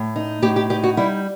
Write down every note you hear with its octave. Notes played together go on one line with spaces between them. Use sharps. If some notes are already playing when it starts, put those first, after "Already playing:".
Already playing: A2
D#4
A2 G4
G4
D#4 G4
F#4
G3 E4